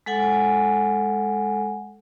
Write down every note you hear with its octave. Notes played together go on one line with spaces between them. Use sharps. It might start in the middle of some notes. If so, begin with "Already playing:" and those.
G#3 A4 F#5 G#5